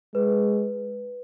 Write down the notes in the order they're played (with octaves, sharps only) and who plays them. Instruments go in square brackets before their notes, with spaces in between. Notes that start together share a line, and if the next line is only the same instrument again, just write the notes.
[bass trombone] G#3 [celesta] B4